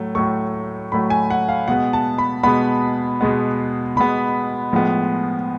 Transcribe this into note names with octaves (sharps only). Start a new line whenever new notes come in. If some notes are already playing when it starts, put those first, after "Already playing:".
Already playing: A2 F#3 A3
A2 F#3 A3 C#6
A2 F#3 A3 B5
G#5
F#5
F5
B2 G#3 B3 F#5
A5
B5
B2 G#3 B3 B5
B2 G#3 B3
B2 G#3 B3 B5
A2 F3 G#3 B3